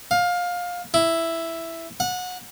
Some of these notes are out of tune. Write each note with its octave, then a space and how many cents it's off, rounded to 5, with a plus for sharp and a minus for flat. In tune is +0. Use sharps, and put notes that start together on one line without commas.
F5 +20
E4 +5
F#5 -25